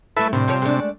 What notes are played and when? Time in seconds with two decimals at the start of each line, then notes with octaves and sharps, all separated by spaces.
0.17 A3 E4 A4 B4 E5
0.33 A2 C3 D#3 D4
0.48 F3 C4 C#5
0.62 G#3 A3 D4